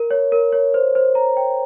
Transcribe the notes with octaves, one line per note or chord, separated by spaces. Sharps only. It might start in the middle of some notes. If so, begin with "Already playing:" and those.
Already playing: A#4
C#5
A#4
C#5
C5
C5
A#5
G5